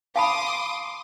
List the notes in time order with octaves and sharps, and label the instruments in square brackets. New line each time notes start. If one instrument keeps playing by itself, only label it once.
[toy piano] F5 A5 B5 [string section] C6 D6 D#6